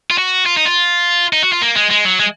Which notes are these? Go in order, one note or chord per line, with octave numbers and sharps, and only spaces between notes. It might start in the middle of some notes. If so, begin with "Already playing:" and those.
F4
F#4
F4
D#4
F4
D#4
F#4
F4
A#3
G#3
G#3
F#3
G#3